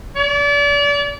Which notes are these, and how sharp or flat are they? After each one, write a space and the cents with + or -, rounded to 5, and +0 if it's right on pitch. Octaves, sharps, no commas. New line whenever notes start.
D5 -35